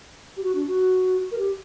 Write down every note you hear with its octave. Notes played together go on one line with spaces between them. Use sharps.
G4
F#4
D4
F#4
A#4
G4